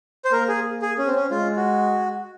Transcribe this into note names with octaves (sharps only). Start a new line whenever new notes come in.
C5
A#3 A#4
G#4
G#4
C#4
C4
C#4
G#3 F4
F#4